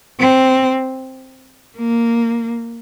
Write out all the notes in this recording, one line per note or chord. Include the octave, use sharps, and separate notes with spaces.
C4
A#3